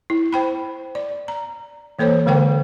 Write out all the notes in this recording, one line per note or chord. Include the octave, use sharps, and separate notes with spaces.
E4
C5 G5 B5
D5
A#5
E3 A#3 A4 C5 C#5
D3 G#3 A#4 C5 G5